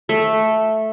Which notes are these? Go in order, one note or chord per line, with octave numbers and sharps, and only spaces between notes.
A3